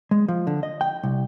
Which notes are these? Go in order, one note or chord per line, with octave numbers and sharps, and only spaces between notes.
G#3
F3
D3
D#5
G5
C2